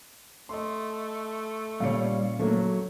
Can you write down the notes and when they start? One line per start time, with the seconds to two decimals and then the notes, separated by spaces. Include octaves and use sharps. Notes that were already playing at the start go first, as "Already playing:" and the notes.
0.49 A3 D#5 C6
1.80 A#2 C#3 G3 C#5 F5 C#7
2.39 F#3 A3 A#3